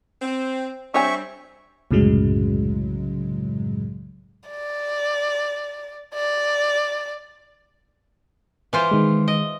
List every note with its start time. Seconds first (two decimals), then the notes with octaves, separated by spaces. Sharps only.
0.22 C4
0.94 G3 C4 D4 C#5 E5 G#5 C#6
1.91 C2 F#2 A2 C#3 F#3 G#3
4.49 D5
6.14 D5
8.73 E3 F4 C5
8.91 D#3 G#3
9.28 D#5